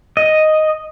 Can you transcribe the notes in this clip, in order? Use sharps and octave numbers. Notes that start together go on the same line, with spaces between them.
D#5